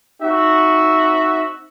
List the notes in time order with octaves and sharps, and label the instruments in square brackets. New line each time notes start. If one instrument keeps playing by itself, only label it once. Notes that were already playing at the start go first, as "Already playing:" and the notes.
[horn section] C4 D#4 F#4 E5